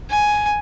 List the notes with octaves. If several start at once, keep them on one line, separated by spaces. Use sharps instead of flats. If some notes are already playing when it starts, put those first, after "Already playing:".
G#5